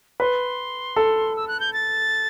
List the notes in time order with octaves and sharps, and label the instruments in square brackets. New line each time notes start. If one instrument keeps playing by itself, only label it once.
[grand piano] B4 [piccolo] C6
[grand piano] A4
[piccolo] E6
F#6
G6
A6